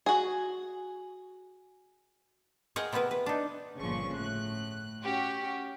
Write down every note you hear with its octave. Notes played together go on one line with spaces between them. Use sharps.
F#4 G#4
G#4 A#4 C#5 D#5 F#5 G5
C3 B3 E4 A#4 B4
B4
D4 D#4
G1 A#2 C#3 F3 C#6
A2 F#6
C#4 F#4 G4